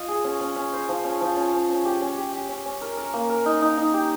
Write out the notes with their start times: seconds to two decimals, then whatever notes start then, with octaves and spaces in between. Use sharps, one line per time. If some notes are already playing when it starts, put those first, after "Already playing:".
Already playing: F4 D#5
0.08 G#4
0.25 C#4
0.41 C#4
0.56 C#4
0.73 C5
0.89 F3
1.04 C#4
1.21 F3
1.37 C#4
1.53 C#4
1.69 C#4
1.85 G4
2.02 C#4
2.17 G4
2.33 G4
2.49 C#4
2.66 C#4
2.81 A#4
2.97 A#4
3.14 A#3
3.30 A#4
3.46 D#4
3.62 D#4
3.78 D#4
3.94 G4